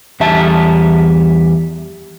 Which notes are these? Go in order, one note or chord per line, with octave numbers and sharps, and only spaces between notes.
E2 G3 E5 A5